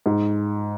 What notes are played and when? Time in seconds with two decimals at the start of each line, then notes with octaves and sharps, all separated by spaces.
0.06 G#2